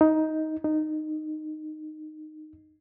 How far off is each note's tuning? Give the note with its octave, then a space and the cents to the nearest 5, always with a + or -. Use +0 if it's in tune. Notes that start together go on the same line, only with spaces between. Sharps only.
D#4 +10
D#4 -15